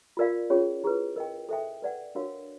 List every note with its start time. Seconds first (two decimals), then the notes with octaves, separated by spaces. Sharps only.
0.17 F4 A#4 D5 F5
0.50 C#4 F4 G#4 C#5
0.84 E4 G#4 B4
1.16 A#4 D#5 G5
1.49 A4 C5 E5 G5
1.82 B4 D5 F#5
2.15 D4 F#4 A#4 C#5 F5